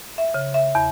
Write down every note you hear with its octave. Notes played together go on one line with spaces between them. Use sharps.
E5
C#3
E5
E2